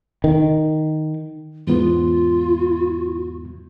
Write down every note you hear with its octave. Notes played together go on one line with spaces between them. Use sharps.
D#3
E2 G#2 B3 F4